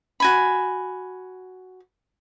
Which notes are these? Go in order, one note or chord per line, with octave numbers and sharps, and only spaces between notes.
F#4 G#5 B5